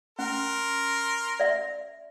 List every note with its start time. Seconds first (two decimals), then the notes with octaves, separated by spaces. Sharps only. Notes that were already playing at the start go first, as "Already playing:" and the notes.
0.19 C#4 A#4 C6
1.40 D5 E5